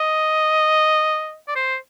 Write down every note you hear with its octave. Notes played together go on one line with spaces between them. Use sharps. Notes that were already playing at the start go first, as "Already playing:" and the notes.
Already playing: D#5
D5
C5